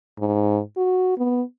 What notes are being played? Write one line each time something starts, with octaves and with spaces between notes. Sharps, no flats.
G#2
F#4
B3